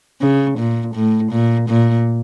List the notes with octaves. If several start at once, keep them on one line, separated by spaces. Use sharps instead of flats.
C#3
A#2
A2
A#2
A#2